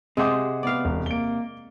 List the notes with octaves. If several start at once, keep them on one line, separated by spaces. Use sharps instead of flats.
C3 G#3 C4 G4 G#4 F#5 D#6
B3 D5 F5
E1
A#3 D7 G7